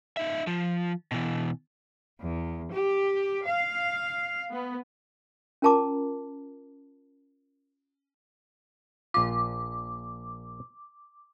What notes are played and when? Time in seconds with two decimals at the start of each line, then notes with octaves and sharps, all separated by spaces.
0.17 D#4 E5
0.47 F3
1.12 B2 E3
2.20 E2
2.72 G4
3.45 F5
4.52 B3
5.62 C#4 F4 A#4 A5 A#5 D6
9.14 A#1 F4 D6